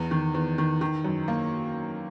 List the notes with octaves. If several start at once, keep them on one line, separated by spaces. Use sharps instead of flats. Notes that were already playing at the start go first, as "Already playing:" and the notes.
Already playing: E2
D#3
E2
D#3
D#3
F#2
A#3